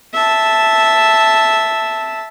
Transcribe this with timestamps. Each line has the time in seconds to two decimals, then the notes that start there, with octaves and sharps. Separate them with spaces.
0.14 E5 A5